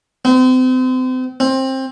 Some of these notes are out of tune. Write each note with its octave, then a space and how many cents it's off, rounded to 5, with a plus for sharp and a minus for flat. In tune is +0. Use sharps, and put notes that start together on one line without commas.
C4 -35
C4 +20